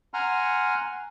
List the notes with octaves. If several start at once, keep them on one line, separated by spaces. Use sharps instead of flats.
F#5 G#5 A#5 C6 F6